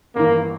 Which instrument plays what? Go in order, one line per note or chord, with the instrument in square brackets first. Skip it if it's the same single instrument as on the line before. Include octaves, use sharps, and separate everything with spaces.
[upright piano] G1 G2 E3 [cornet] A#3